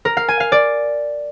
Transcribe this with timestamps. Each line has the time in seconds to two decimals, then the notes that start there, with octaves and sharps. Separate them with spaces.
0.05 A#4
0.17 F5
0.28 G#5
0.40 F5
0.52 D5